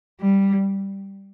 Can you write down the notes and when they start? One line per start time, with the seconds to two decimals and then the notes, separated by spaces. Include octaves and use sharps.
0.20 G3